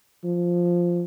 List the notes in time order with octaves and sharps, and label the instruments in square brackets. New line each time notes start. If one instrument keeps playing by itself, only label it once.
[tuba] F3